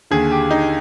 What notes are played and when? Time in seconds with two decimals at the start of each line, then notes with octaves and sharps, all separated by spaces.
0.11 D#2 D3 G#4
0.31 G4
0.51 D#4